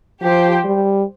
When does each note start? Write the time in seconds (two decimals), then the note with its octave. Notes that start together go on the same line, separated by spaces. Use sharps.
0.21 F3 G4 C5 G5
0.65 G3